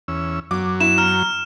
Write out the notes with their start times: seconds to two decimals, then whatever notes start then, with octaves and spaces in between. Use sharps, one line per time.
0.08 E2 C#4 E6
0.51 F#2 F#3 D6
0.80 E4 E7
0.98 A#5 F6